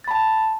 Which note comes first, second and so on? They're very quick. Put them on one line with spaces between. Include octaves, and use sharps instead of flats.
A6 B5 A5